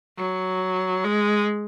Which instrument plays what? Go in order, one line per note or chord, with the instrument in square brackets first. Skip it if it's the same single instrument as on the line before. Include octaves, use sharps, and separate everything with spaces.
[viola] F#3
G#3